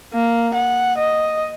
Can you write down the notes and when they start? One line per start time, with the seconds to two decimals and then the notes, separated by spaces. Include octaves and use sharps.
0.14 A#3
0.54 F#5
0.98 D#5